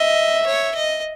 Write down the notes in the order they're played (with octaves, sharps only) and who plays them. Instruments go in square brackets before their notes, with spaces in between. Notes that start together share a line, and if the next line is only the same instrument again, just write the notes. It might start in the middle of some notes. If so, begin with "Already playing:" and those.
Already playing: [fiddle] D#5 [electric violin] E5
[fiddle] C#5
D#5